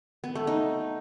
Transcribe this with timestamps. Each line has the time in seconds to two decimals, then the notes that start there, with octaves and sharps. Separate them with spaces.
0.24 B3
0.35 A3
0.47 D#4